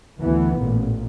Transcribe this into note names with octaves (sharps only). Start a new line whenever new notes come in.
D2 E3 B3
A1 A#2